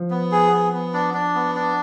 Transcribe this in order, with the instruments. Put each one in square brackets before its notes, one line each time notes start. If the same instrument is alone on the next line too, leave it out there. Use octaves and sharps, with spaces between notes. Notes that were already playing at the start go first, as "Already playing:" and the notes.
Already playing: [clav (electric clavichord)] F3
[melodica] B3
G#4
B3
B3
D4
D4
B3
D4